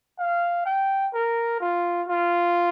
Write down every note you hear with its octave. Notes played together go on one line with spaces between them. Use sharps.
F5
G5
A#4
F4
F4